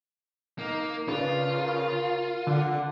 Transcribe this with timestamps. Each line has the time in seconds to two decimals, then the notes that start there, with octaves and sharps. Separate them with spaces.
0.59 A#3 D#4 A#4
1.08 C#3 D4 F4 B4
1.52 A#4
2.47 D3 D4 F#5